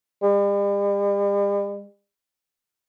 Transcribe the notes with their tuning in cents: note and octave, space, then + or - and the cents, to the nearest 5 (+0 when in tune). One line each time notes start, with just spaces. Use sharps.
G3 +45